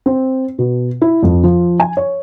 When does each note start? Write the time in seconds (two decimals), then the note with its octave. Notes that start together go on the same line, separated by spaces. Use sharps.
0.06 C4
0.58 B2
1.02 E4
1.23 F2
1.43 F3
1.80 G#5
1.97 C#5